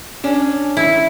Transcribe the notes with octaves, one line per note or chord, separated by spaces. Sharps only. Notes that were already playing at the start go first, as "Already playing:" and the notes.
C#4 D4
E4